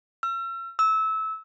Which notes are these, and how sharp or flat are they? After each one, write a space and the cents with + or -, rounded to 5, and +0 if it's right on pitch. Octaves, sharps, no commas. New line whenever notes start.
E6 +40
E6 -20